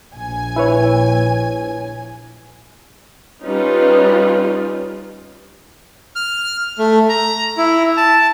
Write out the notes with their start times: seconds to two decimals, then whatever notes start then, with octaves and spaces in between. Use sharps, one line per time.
0.15 A#1 G#5
0.56 E4 B4 C#5
3.43 G3 C#4 D#4 F4 B4
6.16 F6
6.78 A3
7.09 A#5
7.57 E4
7.97 A5